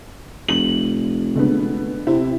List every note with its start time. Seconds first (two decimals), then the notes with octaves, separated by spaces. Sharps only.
0.48 F1 F#7
1.35 D3 G#3 B3
2.07 C3 C4 E4